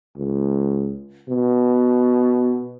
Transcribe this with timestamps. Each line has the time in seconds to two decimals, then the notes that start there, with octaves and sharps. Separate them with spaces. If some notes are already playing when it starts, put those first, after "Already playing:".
0.17 C#2
1.29 B2